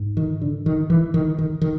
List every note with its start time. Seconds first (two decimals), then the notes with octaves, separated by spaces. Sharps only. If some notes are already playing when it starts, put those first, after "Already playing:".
Already playing: G#2
0.17 D#3
0.42 D3
0.66 D#3
0.90 E3
1.14 D#3
1.39 D#3
1.61 D#3